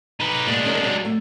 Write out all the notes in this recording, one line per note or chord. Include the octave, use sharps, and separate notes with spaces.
D#4 B4
B2 G#3 A#3 D4
D#3 C#4 A#4
C3 F#3
A3